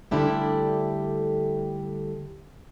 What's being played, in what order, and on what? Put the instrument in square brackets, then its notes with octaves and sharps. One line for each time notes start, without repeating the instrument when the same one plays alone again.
[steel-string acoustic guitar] D3 G3 A3 D4 E4 G4